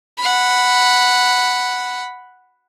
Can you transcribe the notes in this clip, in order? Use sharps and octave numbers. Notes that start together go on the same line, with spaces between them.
F#5 B5